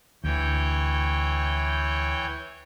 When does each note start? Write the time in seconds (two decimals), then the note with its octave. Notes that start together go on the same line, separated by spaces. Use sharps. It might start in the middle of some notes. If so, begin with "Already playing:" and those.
0.24 D2 E3 C#5 G5